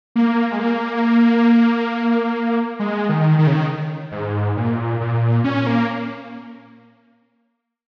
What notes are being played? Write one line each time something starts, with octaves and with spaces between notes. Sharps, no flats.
A#3
G#3
A#3
G#3
D#3
D#3
C#3
D#3
G#2
A#2
A#2
C#4
A#3